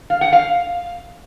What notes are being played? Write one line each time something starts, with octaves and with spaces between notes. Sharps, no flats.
F5
F#5
F5